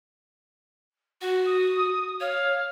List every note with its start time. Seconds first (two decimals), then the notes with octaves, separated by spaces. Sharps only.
1.22 F#4 F#5
1.46 D#6
2.20 C#5 F5